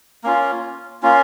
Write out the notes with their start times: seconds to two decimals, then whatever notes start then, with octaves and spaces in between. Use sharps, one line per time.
0.24 A#3 C#4 F4
1.03 A#3 C#4 F4